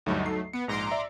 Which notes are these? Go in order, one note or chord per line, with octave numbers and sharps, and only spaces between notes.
D2 G2 F#3 A3 D#4
C7
B3 C#7
A#1 G#2 A#5 C6 D6
D5 E5